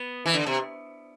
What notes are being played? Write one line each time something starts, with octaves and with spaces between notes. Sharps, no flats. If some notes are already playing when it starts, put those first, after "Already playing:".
Already playing: B3
E3
D3
C3